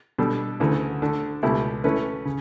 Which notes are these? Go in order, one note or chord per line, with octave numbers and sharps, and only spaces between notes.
B2 G3 D4 A4
D2 C#3 E3 A3
D3 A3 D4
C#2 B2 A3 E4 G4
E3 A3 C#4 E4 B4
C#3